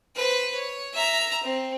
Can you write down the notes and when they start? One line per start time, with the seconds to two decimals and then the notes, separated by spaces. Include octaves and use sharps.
0.16 B4 C5
0.55 C#5
0.93 E5 A#5
1.43 C4